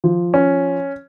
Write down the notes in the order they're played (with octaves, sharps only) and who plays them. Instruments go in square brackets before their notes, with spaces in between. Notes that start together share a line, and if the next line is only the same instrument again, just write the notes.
[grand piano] F3
C#4